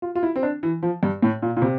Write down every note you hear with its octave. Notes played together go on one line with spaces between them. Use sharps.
F4
F4
E4
C4
D4
E3
F3
G2
A2
A#2
A#2
C3